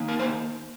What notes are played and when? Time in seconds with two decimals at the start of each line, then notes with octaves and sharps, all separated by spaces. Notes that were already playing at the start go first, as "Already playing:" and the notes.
Already playing: D#3 A#3 D#4
0.08 A#4
0.19 C5